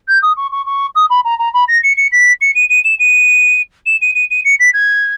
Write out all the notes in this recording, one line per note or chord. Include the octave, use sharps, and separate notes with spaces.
G6
D#6
C#6
C#6
C#6
D#6
B5
A#5
A#5
B5
A#6
C#7
C#7
B6
C#7
D#7
D#7
E7
D#7
E7
D#7
D#7
D#7
C#7
B6
G#6